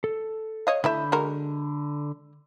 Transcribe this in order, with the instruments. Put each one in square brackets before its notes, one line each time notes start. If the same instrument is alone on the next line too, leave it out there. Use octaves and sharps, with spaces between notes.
[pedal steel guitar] A4
[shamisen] C#5 D#5 F5
[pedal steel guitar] D3 B5 G6 [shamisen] A3 E4 E5
[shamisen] G#3 F#4 A#4